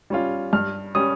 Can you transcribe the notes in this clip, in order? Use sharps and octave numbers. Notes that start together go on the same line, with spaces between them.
G3 C#4 F4
G2 F6
G3 C#4 D#6